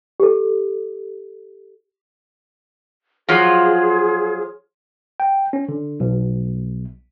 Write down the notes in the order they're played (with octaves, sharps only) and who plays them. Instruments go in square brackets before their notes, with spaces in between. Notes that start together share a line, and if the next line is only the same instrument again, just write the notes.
[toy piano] G4 A4
[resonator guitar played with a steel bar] F3 F#3 F4 [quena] G#4
[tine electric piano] G5
C#4
D3
B1